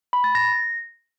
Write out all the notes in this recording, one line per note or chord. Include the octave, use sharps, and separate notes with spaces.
B5
A6
A#6